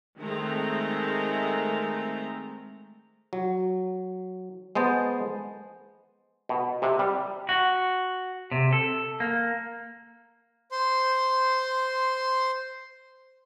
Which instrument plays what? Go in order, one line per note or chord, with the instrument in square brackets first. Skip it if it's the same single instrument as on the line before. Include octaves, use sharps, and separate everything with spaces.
[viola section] D#3 G#3 A3 C4 A#5
[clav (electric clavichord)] F#3
G#3 B3 C5 A5
B2
C3
G3
[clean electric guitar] F#4
C3
A4
A#3
[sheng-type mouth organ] C5 C6